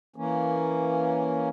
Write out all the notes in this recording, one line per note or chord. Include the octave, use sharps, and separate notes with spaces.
E3 A#3 C#4